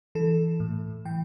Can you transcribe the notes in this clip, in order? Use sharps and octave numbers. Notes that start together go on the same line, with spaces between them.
E3 A4
A2
E3 G5